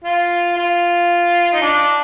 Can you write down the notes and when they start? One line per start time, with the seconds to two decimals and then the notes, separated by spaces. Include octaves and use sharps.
0.05 F4
0.57 F4
1.53 D#4
1.62 D4